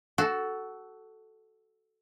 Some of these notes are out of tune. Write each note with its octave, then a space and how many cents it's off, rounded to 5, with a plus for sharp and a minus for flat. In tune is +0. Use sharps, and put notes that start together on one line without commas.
F#4 +15 A4 -5